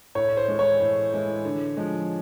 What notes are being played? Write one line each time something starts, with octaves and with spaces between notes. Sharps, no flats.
A2 C#5
C5
E3 G#3
C#5
A2
E3 G#3
D3
F3 G#3